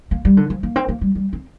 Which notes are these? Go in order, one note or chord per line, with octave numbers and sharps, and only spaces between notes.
A#3
G3
D3
F3
A#3
C4
A#3
G3
G3
C4